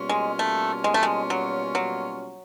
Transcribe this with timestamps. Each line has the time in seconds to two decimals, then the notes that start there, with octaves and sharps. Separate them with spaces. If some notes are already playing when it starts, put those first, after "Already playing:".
Already playing: B2 G3 A#3 C#4 F4
0.09 G#3
0.39 A3
0.84 G#3
0.94 A3
1.03 G#3
1.30 F#3
1.75 F#3